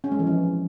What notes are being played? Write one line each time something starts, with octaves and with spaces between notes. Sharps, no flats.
C#4
G#3
E3
F3